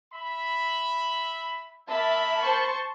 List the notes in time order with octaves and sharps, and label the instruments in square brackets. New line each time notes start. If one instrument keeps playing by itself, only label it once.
[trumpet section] E5 B5
[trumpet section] A#3 A#4 B5 [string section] E5 A5
[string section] C5 A5 C#6